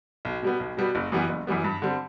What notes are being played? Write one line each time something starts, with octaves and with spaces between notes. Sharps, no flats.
B1
B2 G3 B3
B1
B2 G3 B3
F#1
F#2 E3 G3 B3
F#1
F#2 E3 G3 B3
G2
D3 G3 C4